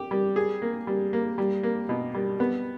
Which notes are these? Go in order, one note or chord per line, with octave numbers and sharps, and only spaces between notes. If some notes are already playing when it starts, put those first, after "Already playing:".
Already playing: G4
G3
G#4
A#3
G3
A#3
G3
A#3
B2
G3
B3